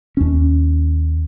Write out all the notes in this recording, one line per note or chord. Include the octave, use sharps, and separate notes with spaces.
D#2 C#4